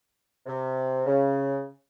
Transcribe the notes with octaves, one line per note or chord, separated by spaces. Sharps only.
C3
C#3